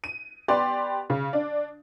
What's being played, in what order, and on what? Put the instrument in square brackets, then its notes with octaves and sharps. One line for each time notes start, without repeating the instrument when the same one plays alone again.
[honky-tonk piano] D#7
B3 G4 D5 C6
C#3
D4